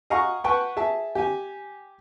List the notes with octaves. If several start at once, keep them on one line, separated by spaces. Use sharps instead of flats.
D#5 F5 F#5 G#5 A#5 C#6
B4 F#5 G5 A5 C#6
G#4 E5 A5
G4 G#5